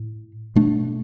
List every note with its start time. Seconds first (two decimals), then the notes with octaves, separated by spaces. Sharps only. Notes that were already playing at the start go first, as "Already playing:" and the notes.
Already playing: A2
0.55 B2 A3 D4